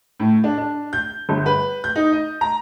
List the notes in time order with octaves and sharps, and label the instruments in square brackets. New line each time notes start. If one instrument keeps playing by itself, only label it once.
[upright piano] A2
D4
D4
G6
G1
B4
G6
D#4
D#5
A#5